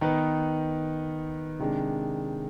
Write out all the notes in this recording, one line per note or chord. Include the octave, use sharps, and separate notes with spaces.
D#3 B3 D#4 B4
C3 D#3 G#3 D4